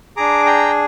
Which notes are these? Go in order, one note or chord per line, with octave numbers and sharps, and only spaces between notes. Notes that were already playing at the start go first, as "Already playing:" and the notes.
D4 G#4 A#5 D6
G5 A#5